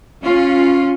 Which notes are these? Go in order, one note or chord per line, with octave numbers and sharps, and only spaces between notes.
C#4 F4